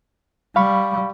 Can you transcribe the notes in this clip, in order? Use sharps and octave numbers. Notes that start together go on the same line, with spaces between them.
G3 F5 B5 C#6